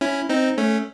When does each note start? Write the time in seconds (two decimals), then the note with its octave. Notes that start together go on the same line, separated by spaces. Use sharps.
0.01 C#4 E4
0.29 C4 D#4
0.58 A3 C#4